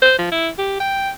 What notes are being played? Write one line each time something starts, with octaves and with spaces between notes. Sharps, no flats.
C5
F3
E4
G4
G5